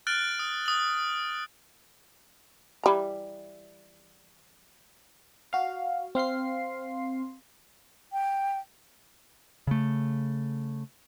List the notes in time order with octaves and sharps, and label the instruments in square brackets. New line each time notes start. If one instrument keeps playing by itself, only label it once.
[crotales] F6 F#6 A6 D7 F#7
D#6
D#6 F#7
[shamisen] E3 G3 A#5
[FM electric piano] F#4 F5
C4 F5 C6 C7
[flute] G5
[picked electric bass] C#3 A3